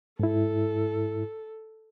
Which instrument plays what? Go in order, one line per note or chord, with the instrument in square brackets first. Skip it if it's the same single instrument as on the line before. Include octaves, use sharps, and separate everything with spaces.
[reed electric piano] G#2 E4 [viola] A4